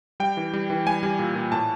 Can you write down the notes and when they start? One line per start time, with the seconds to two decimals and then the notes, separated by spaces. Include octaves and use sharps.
0.20 G3 G5
0.37 E3
0.53 G3
0.70 E3
0.86 G3 G#5
1.03 G3
1.19 A#2
1.35 A#2
1.52 A2 A5